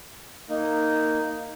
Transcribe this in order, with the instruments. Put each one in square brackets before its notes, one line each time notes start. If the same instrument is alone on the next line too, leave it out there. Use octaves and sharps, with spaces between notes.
[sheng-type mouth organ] A#3 D#4